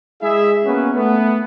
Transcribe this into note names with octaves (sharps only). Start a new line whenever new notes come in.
G#3 E4 G#4 E5
A#3 B3 C#4 F#4 B4
A3 B3